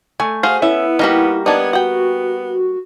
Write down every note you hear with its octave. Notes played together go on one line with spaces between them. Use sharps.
A3 G#5
F#4 G#4 C5 F5 G#5
B3 C#4 E4 E5
G3 A#3 D#4 F#4 G4
B3 D4 D#4 G#6
F#4 F#5 G5